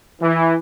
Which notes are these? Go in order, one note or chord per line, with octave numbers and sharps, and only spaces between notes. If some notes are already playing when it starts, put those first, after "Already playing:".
E3